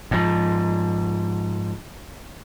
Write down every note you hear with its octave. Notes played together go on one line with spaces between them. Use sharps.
G#2 F3